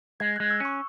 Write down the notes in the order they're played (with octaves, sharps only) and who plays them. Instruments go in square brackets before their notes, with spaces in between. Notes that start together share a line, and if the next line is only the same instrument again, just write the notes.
[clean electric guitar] G#3 [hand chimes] G#6
[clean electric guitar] G#3 [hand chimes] F#6
[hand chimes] E6
[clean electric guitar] C#4 [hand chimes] C#6